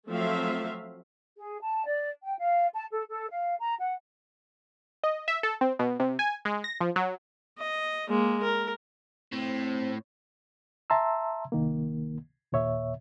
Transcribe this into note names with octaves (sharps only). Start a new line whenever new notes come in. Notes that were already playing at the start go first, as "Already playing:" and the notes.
F3 F#3 A3 C4 E5 F5
G#4
A5
D5
G5
F5
A5
A4
A4
F5
A#5
F#5
D#5
E5
A4
C4
B2
C3
G#5
G#3
A#6
F3
F#3
D#5
G#3 A#3
A#4
A2 C4
E5 A5 A#5 C6 E6
C2 D#3 A#3
D#2 A#2 C#5 E5